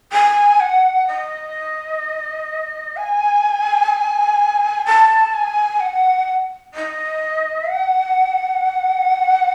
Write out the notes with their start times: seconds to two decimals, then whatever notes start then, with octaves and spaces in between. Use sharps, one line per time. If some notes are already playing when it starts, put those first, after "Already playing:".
0.12 G#5
0.60 F#5
1.07 D#5
2.96 G#5
4.85 A5
5.33 G#5
5.79 F#5
6.74 D#5
7.68 F#5